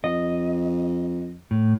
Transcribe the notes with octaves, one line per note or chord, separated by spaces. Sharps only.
F2 D#5
A2